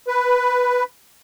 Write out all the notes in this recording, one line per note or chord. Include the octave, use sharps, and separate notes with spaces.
B4